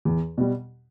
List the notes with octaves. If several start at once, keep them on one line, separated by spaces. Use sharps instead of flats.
E2
B2 G3